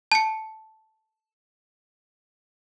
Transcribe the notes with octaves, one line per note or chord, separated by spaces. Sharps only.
A5 C#7